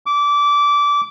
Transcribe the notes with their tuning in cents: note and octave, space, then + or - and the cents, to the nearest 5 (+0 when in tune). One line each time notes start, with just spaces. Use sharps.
D6 -20